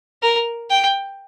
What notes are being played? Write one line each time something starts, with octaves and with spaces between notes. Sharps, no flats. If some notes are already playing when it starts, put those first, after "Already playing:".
A#4
G5